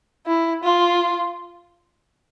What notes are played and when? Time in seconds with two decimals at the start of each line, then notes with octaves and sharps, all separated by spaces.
0.27 E4
0.63 F4